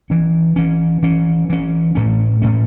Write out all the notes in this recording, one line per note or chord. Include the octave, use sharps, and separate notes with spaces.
E3 C#4
E3 C#4
E3 C#4
E3 C#4
A2 A3 C#4
A2 A3 C#4